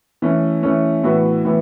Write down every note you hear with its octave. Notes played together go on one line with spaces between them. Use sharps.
E3 A3 C#4
E3 A3 C#4
A2 E3 B3 F#4
A2 E3 B3